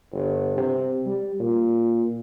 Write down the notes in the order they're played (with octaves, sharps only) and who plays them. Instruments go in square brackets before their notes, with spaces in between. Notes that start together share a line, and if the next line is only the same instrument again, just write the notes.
[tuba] G1
C3
G3
A#2